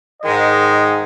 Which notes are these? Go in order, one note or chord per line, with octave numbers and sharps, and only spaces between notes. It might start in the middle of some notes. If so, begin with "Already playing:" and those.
G#2 D#3 G#3 D#5